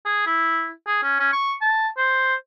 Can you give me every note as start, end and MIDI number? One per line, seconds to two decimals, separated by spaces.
0.05 0.22 68
0.27 0.70 64
0.87 0.98 68
1.03 1.15 61
1.20 1.28 61
1.33 1.53 85
1.61 1.88 81
1.97 2.35 72